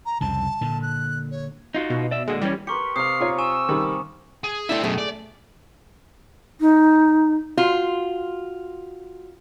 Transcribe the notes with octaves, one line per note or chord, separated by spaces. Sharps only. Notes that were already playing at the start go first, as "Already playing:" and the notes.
A#5
C2 F2 C#3 A5
A#2 D3
F#6
C#5
D#4 F4 F#4
B2
D5 E5
A#2 D3 G#3 F#4
E3 G3 C#4
G4 A#4 B4 C6 C#6 C#7
C3 F5 D#6 C7
F4 C#5 G5 A#5
G#5 C#6 E6 E7
D#3 G3
G#4
A3 D4 E4 C5 E5
F#2 B2 A3 G#4
D5
D#4
F4 F#4